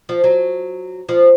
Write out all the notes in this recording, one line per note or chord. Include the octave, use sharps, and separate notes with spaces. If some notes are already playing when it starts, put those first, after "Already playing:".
F3
F#3
F3